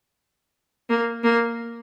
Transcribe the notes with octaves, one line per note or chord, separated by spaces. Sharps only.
A#3
A#3